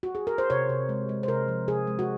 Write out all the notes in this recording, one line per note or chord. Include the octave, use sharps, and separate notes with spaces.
F#4
G#4
A#4
C5
C3 C#5
C3
G#3
G#3
C5
C3 A#4
F3
C3 G#4
G#3
F#4